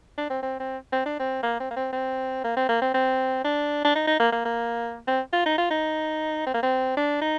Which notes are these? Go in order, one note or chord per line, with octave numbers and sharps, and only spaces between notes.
D4
C4
C4
C4
C4
D4
C4
A#3
C4
A#3
C4
C4
A#3
C4
A#3
C4
C4
D4
D4
D#4
D#4
A#3
A#3
A#3
C4
F4
D#4
F4
D#4
C4
A#3
C4
D4
D#4